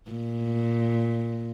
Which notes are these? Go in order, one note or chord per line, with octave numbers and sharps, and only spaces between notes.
A#2